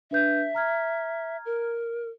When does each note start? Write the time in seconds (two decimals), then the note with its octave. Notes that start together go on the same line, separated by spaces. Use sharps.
0.11 D4 B4 E5 G6
0.55 A#5 F6 G#6
1.45 A#4